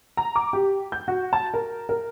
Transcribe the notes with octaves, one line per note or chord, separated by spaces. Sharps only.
A#5
D6
G4
G6
F#4
A5
A#4
A#4